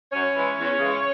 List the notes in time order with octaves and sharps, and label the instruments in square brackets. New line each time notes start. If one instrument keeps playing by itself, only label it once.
[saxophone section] F#2 C#4 C#5
E3 G#3
E2
C#3 E3 G#3